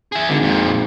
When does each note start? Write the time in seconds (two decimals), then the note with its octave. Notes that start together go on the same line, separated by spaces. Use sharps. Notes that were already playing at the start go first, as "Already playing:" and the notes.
0.12 G#4 E5
0.29 G#1 D3
0.42 F2 A#2